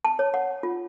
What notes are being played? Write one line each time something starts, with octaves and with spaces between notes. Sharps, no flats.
A5
C#5
F#5
F4